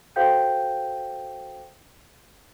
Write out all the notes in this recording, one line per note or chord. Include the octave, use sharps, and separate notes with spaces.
F#4 A4 C5 F5 G5 G6